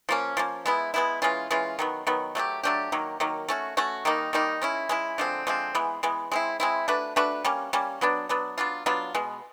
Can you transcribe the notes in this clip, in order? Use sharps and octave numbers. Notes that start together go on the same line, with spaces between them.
F3 A#3 C#4
F3 A#3 C#4
G#3 B3 E4
G#3 B3 E4
E3 G#3 C#4 F4
E3 G#3 C#4 F4
D#3 F#3 B3
D#3 F#3 B3
F#3 A3 D4 G4
F#3 A3 D4 G4
D#3 F#3 A#3
D#3 F#3 A#3
A3 C#4 F#4
A3 C#4 F#4
D#3 G3 A#3 D#4
D#3 G3 A#3 D#4
G#3 C#4 E4
G#3 C#4 E4
D3 F3 G#3 C4
D3 F3 G#3 C4
E3 G#3 B3
E3 G#3 B3
G#3 C4 E4
G#3 C4 E4
A3 D4 F#4 B4
A3 D4 F#4 B4
G3 A#3 C#4
G3 A#3 C#4
F#3 B3 D4
F#3 B3 D4
F#3 B3 D4 F4
F#3 B3 D4 F4
B2 G#3 B3